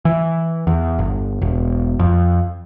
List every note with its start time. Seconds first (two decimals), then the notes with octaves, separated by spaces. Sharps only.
0.05 E3
0.67 E2
0.99 G1
1.42 E1
1.99 F2